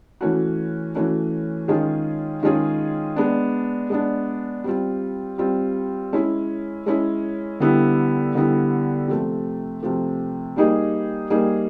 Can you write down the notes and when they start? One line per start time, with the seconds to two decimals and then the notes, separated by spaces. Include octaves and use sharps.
0.21 E3 A3 C#4 F#4
0.95 E3 A3 C#4 F#4
1.68 D#3 G#3 C#4 F4 G#4
2.43 D#3 G#3 C#4 F4 G#4
3.16 G#3 B3 D4
3.90 G#3 B3 D4
4.64 G3 C4 F4
5.38 G3 C4 F4
6.13 G#3 C#4 E4
6.86 G#3 C#4 E4
7.60 D3 G3 B3 E4
8.35 D3 G3 B3 E4
9.08 C3 F3 A3
9.83 C3 F3 A3
10.56 G3 A#3 D#4 G#4
11.30 G3 A#3 D#4 G#4